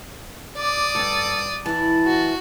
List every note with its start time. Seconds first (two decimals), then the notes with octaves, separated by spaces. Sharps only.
0.58 D5 D6 D#6
0.95 D2 G2 A4
1.66 E3 E4 A5
2.06 F#4